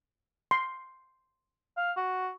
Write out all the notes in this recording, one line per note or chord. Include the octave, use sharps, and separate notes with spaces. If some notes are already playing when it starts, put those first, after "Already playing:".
C6
F5
F#4